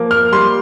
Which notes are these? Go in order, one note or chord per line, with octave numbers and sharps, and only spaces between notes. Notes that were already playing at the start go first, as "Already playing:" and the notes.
Already playing: F3 A#3
F6
G3 C6